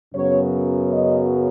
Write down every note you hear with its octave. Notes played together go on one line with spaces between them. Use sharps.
F#2 C#3 F#3 B3 C#5
D#5